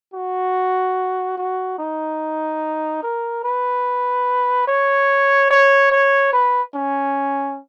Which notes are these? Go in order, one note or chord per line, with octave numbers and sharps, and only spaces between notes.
F#4
F#4
D#4
A#4
B4
C#5
C#5
C#5
B4
C#4